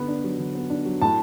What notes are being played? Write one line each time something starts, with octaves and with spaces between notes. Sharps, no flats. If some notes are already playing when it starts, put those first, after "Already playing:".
Already playing: D3 B3 B5
D4
F#3
D3
B3
D4
F#3
A2 A5